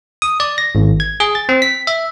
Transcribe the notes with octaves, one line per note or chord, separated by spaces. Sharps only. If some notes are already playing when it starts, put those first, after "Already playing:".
D#6
D5
A#6
G#1
G#6
G#4
A6
C4
B6
E5